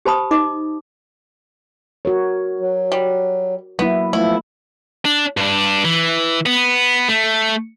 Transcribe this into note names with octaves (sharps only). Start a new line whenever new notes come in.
G4 C5 A5 B5 D#6
D#4 D#5 D6
F#4 A#4 C#5
F#3
G3
F#3 A#3 B3 E4
F3 A3 B3 E4
D4
G2 D4
E3
B3
A3